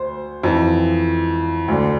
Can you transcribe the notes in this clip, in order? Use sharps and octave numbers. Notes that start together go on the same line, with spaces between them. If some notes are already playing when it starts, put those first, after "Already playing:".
Already playing: D2 C5
F2 E3
D2 D3